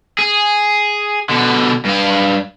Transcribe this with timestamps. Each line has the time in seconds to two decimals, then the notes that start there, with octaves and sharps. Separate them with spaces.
0.19 G#4
1.29 B2 D3
1.85 G2 F5